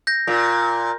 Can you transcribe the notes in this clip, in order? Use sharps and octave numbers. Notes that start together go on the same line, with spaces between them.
G6 A#6
A#2